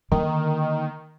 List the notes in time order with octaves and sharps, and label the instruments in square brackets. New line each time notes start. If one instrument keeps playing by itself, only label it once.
[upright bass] D3 A#3 [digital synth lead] D#3